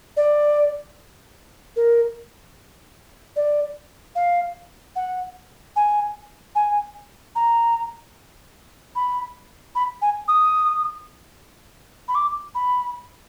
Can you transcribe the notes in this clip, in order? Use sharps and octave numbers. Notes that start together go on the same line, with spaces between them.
D5
A#4
D5
F5
F#5
G#5
G#5
A#5
B5
B5
G#5
D#6
B5
D6
B5